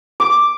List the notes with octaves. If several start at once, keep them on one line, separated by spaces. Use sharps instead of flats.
D6